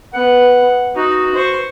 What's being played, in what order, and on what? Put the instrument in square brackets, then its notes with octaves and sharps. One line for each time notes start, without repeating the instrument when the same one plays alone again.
[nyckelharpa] B3 [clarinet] F#5
[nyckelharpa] D#4 [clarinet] F#4
[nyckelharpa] C5 C#6